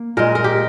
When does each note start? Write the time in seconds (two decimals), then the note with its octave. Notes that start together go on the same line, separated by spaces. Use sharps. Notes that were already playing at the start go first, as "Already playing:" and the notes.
Already playing: A#3
0.17 A#2 G#3 A#4
0.35 A#4
0.44 G4